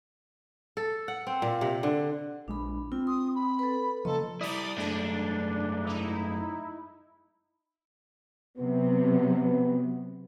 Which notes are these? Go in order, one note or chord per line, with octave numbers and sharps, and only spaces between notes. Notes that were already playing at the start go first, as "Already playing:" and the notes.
A4
F#5
C4
A#2
C3
D3
A#1 G#3 D4 B5
C4 F4
C6 D#6
B5
A4 B4
C#3 F3 A#3 A4 D#5 C6
G3 E4 D5 D#6
F#2 G#3 A3 D4
D#4 E4
C3 F#3 B3